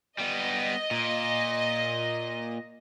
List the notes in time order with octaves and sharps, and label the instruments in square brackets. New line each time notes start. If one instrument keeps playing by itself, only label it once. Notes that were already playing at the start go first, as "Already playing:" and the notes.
[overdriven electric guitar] G3 B3 [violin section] D#5
[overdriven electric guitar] A#2